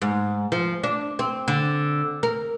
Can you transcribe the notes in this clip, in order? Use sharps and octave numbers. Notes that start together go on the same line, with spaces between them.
G#2
F3
D4
C4
D3
A#4